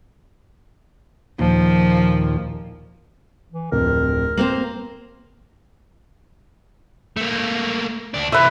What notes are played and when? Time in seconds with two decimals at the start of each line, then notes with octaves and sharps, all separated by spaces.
1.39 D#2 A#2 F3
3.52 E3
3.72 D1 F2 A#4
4.37 A#3 C4 C5 F#7
7.17 A3 A#3
8.14 D2 D4
8.32 C3 E3 B4 E5